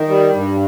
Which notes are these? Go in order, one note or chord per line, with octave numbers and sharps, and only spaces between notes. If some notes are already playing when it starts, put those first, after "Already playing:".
Already playing: D#3
G3
G2